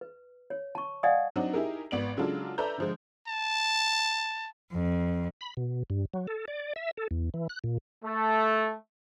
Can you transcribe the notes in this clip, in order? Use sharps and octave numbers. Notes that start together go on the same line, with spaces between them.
B4
C#5
A5 C#6
D5 D#5 F5 F#5 G#5 D#6
F#3 C4 D4 D#4 F#4
D#4 E4 G4 G#4 A#4
G#1 B3 D5 D7 F#7
C#3 F#3 G#3 D4 F4 A4
A4 B4 D5 E5 A#5 G6
D3 F3 G#3
A5
F2
B5
B2
G2
F#3
A4
D5
E5
A4
E2
E3
F#6
A#2
A3